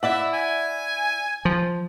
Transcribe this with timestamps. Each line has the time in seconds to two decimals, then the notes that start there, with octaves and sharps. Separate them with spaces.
0.03 E4 D5 E5 F#5
0.34 G#5
1.45 F3